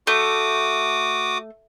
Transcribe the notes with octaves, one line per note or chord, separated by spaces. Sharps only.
A3 F#4 D6 D#6